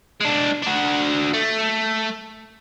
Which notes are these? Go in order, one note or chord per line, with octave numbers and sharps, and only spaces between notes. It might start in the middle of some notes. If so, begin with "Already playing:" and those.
G#3 D4
D4 F#4
A3